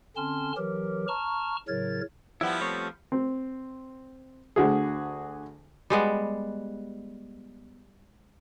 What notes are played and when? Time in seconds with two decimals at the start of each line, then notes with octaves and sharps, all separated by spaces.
0.16 D3 C4 C#4 A5 C6 F6
0.57 E3 F#3 G4 A#4
1.08 A5 A#5 C#6 F6
1.68 A2 C#3 F#3 A#4 C#5 A6
2.41 F3 G3 B3 E4
2.62 A3 C4 C#5
3.12 C4
4.56 D2 D3 F#4 G#4
5.90 G3 G#3 B3